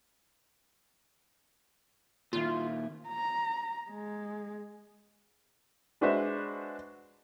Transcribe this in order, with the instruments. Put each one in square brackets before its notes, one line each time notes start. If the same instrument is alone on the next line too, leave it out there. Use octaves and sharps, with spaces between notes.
[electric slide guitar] A#2 D#3 E4 [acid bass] F4
[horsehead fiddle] A#5
G#3
[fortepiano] G#3 D4 F#4 B4 C5 E5